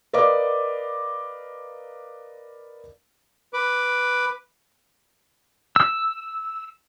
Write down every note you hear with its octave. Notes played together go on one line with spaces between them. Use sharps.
A#4 B4 D5 D#5 F5 D6
B4 D6
E6